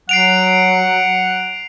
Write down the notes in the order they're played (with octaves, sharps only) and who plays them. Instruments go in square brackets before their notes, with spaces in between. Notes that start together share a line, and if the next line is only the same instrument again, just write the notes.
[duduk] F#3 [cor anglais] F#5 [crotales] C7 D7 F7